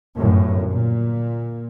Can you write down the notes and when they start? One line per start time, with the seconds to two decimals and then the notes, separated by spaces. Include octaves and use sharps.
0.17 G1 F#2 A2
0.69 A#2